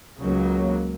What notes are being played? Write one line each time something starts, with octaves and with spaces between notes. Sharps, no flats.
C#2 C#3 F#3 A#3